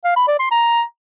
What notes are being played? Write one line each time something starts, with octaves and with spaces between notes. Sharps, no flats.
F5
B5
D5
C6
A#5